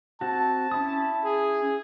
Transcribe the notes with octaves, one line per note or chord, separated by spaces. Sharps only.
C4 F#4 A5
C#4 E4 D#6
G#4